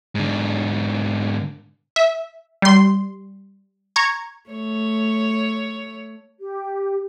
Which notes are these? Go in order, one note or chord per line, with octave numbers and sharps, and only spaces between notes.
G#2 D3
E5
G3 C6
A#5 C#6 G#6
A3 C#5
G4